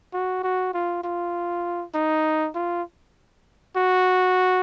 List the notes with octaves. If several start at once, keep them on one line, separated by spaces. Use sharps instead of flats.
F#4
F#4
F4
F4
D#4
F4
F#4